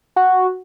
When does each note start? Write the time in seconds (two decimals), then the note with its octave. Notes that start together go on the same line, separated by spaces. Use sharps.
0.16 F#4